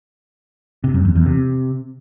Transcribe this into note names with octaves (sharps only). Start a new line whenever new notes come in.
C3
F#2
E2
E2
C3